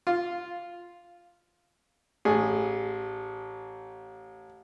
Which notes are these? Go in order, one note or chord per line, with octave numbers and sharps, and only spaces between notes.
F4
A1 G#4